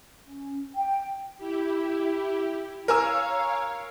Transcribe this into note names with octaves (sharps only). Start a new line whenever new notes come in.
C#4
G5
E4 G4
A#4 C#5 F5 G#5 E6